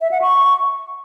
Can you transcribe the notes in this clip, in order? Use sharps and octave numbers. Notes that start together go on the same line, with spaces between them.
E5
F#5
C#6